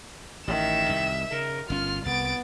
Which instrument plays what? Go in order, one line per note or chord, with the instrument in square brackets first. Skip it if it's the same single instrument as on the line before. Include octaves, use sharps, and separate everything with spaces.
[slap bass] A1 [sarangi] D#3 [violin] E5 E7
[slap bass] C2
[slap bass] C#3 [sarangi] A#4
[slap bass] G1 C#4 [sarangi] F4 [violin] F6
[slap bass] C2 [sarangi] B3 [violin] A6 D7